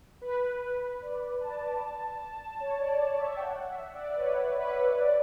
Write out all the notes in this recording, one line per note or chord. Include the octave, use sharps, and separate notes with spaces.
B4
B4
D5
A5
C#5
D5
E5
G5
F#5
E5
D5
B4
C#5
B4
D5